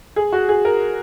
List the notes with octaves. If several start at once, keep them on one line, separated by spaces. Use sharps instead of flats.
G#4
F#4
G#4
A#4